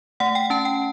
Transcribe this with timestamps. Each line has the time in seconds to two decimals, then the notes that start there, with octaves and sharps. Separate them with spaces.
0.20 A3 F#5
0.35 G5
0.50 C#4 A5
0.65 G5